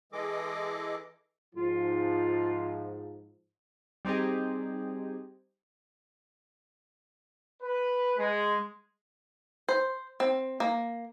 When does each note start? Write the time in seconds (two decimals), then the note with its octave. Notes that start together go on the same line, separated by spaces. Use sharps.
0.12 E3 G#3 G#4 A4 D#5 D6
1.55 G#2 F3 F4
4.05 G3 C4 D#4 G4 G#4
7.63 B4
8.18 G#3
9.69 C5
10.20 C4
10.60 A#3